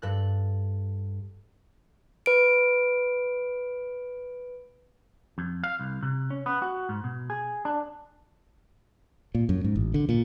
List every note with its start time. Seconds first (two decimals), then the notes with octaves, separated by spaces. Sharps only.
0.02 G2 A4 F#6
2.26 B4 D7
5.38 F2
5.64 F5
5.79 C2
6.03 C3
6.30 C#4
6.46 B3
6.62 F#4
6.89 G#2
7.04 B2
7.30 G#4
7.65 D4
9.35 A#2
9.49 F#2
9.64 G#2
9.76 A1
9.94 D3
10.09 A#2